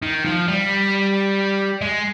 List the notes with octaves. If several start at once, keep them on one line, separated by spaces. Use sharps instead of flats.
D#3
F3
G3
G#3